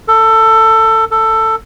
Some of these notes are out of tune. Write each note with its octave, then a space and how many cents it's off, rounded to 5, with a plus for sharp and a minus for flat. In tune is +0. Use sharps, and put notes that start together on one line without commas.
A4 +20
A4 +15